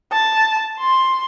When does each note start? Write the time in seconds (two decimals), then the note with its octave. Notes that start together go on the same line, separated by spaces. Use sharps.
0.12 A5
0.79 C6